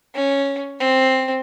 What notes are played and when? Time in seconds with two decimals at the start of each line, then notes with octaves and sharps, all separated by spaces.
0.15 C#4
0.80 C4